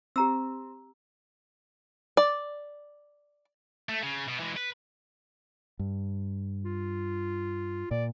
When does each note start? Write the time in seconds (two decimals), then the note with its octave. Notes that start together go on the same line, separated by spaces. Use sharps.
0.16 C4 G4 A#5 E6
2.17 D5
3.89 A3
4.03 C#3
4.29 B2
4.40 E3 G#3
4.57 B4
5.79 G2
6.65 F4
7.91 A#2 D5